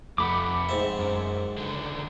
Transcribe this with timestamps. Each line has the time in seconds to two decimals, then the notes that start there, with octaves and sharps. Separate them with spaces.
0.18 F2 A3 F#5 B5 D6
0.69 G#2 C4 E5
0.99 F#2
1.58 C#2 D3